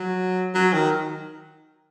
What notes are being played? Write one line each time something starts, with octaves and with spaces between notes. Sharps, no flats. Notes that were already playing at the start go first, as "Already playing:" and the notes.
Already playing: F#3
F#3
D#3